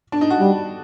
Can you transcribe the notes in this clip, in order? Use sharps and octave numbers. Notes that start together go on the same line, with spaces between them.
D4
D#4
F#4
G3